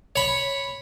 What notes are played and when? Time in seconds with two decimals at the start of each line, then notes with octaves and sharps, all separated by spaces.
0.16 C#5 B5